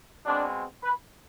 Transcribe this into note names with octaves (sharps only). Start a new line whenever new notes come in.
B2 G#3 C4 D4
B4